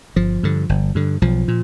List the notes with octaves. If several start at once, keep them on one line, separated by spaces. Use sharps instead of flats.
G1 F3
G2 D3
G1
G2 D3
B1 F3
A#2